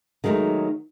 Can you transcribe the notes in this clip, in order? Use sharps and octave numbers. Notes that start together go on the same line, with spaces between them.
D#3 F#3 G#3 A3 C#4 D#4